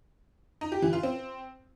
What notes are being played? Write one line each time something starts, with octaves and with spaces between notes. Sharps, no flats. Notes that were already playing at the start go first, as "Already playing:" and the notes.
D#4
G4
E3
F4
C4